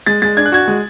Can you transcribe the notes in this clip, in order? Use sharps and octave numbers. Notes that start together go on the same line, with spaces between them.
G#3 A6
G#3 A6
D4 G#6
F#6
F#4 G#6
G#3